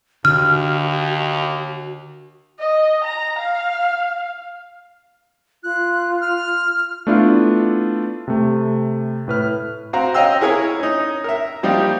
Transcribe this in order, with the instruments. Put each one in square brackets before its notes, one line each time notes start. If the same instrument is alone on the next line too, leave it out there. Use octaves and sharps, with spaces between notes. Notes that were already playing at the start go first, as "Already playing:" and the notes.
[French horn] D#2 [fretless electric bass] D3 [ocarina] F#4 [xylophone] F6
[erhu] D#5
A#5
F5
[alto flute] F4 [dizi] F#6
[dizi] F6
[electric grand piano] A3 B3 D4 E4 F4
C3 A3
A2 B4 F6
[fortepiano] C4 F#4 F5 A#5
C#4 D#5 F5 G5 E6
E4 G#4 A#4 C#5
C#4 D#4
A#4 E5
F3 G3 A#3 D#4 G4